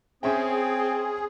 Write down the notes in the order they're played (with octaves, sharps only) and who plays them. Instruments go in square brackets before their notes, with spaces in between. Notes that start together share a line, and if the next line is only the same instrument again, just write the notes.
[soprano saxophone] C4 [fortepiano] C#4 E5 G5 [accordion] G#4